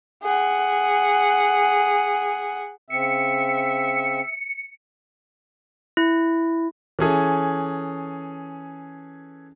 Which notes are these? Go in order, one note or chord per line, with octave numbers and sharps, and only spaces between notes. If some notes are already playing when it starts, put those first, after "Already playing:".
G#4 F#5
C#3 C4 E5 C#7
E4
E3 C#4 G#4 A4